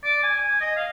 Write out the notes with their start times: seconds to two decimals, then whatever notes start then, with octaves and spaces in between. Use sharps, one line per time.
0.04 D5
0.23 G#5
0.39 G#5
0.61 D#5
0.76 F5